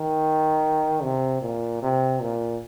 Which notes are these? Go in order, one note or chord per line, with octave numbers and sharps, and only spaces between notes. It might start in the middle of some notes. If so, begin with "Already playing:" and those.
Already playing: D#3
C3
A#2
C3
A#2